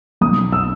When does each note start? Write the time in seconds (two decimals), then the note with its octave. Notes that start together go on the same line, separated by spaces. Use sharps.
0.21 B1 D#6
0.52 E6